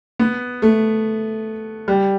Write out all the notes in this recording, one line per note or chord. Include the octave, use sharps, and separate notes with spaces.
B3
A3
G3